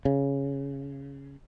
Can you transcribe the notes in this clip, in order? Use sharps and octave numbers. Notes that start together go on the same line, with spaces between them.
C#3